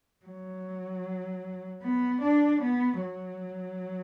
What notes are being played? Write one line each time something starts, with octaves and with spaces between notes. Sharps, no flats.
F#3
B3
D4
B3
F#3